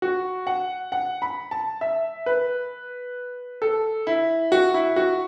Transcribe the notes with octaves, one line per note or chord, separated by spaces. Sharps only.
F#4
F#5
F#5
B5
A5
E5
B4
A4
E4
F#4
E4
F#4